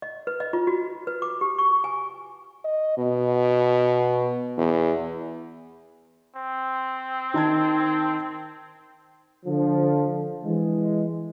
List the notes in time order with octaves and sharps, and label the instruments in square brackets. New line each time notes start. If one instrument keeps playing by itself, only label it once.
[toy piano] D#5
B4
D#5
F4
F#4
B4
D6
G4
C#6
G#5
[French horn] D#5
B2
E2
[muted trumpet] C4
[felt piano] D#3 A5 G#6
[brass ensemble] D3 F3
E3 G#3